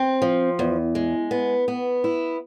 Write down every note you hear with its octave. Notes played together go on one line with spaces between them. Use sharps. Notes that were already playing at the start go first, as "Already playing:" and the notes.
Already playing: C4
F3
E2
G#3
B3
B3
E4